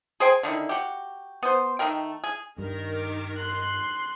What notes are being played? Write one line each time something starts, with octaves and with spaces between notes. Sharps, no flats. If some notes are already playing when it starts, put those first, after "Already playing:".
G#4 C5 G5 G#5
D3 D#3 E4
F#4 G4
B3 C5
D#3 A3 A#4 G5
G#4
G2 D#3 G3 A#4
D6
C6 F#6